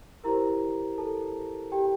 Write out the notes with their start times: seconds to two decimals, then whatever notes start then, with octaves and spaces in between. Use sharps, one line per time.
0.24 E4 G4 A#4 C5 A#5
0.98 A4 A5
1.72 G4 G5